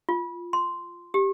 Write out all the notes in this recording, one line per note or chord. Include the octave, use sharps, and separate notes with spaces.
F4
C6
G4